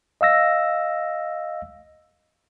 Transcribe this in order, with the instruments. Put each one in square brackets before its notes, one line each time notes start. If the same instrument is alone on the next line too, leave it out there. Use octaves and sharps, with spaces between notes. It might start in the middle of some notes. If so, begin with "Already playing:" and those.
[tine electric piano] D#5 F5 E6 A#6